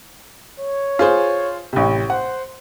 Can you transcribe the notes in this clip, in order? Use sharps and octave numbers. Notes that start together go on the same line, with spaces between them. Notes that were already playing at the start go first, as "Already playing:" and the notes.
C#5
F4 G#4 C5
A1 C3
C5 F#5